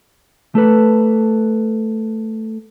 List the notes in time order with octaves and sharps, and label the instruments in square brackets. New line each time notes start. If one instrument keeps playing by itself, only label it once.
[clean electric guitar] A3 A4 B4